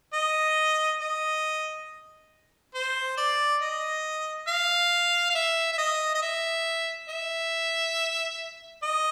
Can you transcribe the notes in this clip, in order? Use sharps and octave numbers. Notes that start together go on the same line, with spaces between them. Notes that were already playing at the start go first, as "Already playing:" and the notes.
D#5
D#5
C5
D5
D#5
F5
F5
E5
E5
D#5
D#5
E5
E5
D#5